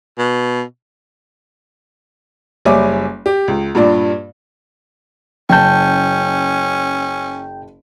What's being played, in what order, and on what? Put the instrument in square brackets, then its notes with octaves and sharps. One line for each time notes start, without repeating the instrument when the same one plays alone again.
[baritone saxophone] B2
[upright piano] F#1 G3 C#5 E5 G#5 D6
G4
C#2
G2 A#2 G3 D4
[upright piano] F#1 A5 [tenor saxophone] C#4 [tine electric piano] G5 G6